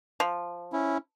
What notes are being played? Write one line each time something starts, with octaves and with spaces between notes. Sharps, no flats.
F3
C#4 E4